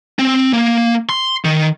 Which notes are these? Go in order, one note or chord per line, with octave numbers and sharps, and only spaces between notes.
C4
A#3
C6
D#3